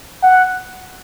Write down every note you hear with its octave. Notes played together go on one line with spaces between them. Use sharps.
F#5